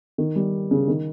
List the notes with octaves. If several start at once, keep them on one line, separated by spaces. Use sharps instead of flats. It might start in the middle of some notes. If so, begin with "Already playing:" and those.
D#3
G3
C#3
D#3